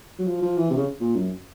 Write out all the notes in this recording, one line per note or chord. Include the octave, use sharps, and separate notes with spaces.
F#3
F3
F3
E3
C3
C#3
A#2
F#2